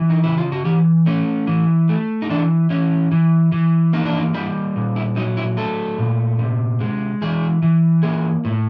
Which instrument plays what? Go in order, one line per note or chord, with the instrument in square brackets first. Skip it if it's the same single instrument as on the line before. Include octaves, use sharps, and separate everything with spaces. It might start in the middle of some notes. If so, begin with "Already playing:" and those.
Already playing: [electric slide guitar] E3
D#4
C#3 E4
F4
F#4
E3 G4
A3 C#4
E3
A3
D#4
E3 D4
E3 C#4
E3
E3
A#3 D#4
D4
D#4
G3 E4
A#2
E4
F#3 D#4
E4
A3 A4
A#2
C3
G#3
E3 G#4
E3
A#3 G#4
A2